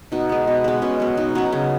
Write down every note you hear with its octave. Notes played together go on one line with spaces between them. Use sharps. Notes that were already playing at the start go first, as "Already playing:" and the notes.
B2 D#4
G#3 B3
B2
G#3 B3
B2 C#4
F#3 B3
B2 D#4
F#3 B3 C#4
C#3